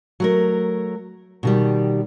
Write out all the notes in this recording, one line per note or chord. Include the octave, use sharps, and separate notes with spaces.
F#3 A3 A#4
B2 D#3 G3